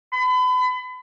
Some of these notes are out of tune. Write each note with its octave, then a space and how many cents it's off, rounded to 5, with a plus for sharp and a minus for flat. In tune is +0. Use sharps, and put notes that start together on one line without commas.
B5 +35